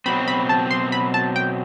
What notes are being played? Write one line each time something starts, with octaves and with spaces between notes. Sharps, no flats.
B2 F#3 C4 B5
B5
A5
C6
B5
A5
G5